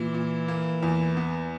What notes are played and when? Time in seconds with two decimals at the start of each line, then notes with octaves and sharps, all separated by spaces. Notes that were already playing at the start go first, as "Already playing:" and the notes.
Already playing: A#2 E3
0.14 A#2
0.48 A#3
0.83 E2
1.17 B3